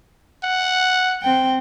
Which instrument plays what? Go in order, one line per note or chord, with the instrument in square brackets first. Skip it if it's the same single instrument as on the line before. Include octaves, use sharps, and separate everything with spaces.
[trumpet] F#5
[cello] C4 G5